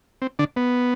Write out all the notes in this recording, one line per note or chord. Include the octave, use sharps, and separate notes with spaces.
C4
D3 D4
B3